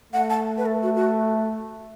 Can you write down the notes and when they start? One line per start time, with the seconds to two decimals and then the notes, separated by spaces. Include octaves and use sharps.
0.13 A3 F#5
0.30 A5
0.58 B4
0.66 A4
0.83 F#4
0.96 F#4